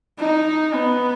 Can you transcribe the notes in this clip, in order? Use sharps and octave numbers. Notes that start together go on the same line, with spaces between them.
D#4
B3